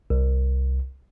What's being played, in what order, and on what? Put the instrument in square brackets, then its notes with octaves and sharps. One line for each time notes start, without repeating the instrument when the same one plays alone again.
[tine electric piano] C2